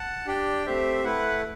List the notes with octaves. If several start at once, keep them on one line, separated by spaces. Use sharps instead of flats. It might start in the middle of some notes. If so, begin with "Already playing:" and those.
Already playing: F#5 A5
D4 G4 D5 G5
A3 C4 G4 C5 E5
A3 E4 B4 F#5